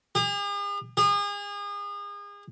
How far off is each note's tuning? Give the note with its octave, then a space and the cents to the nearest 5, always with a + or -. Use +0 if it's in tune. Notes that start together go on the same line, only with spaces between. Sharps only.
G#4 -45
G#4 -35